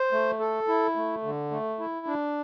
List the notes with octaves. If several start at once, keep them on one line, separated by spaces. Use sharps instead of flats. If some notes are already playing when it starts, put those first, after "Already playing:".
Already playing: C5
A3
A4
E4
A3
D3
A3
E4
D4